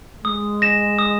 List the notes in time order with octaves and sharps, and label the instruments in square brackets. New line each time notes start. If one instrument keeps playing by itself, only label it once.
[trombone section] G#3 [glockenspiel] D#6
[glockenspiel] A#6 E7
D#6